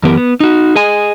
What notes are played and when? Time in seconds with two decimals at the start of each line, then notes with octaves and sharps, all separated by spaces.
0.03 F#2 E3 B3 G4 A#4
0.17 B3
0.40 D#4 F#4
0.76 G#4 D#5 G#5